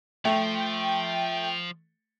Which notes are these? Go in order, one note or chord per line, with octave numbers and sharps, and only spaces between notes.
F3 A3 G5